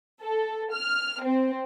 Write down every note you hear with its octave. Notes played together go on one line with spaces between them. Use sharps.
A4
F6
C4